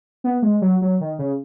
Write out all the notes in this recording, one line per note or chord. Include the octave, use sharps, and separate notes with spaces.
B3
G#3
F#3
F#3
D#3
C#3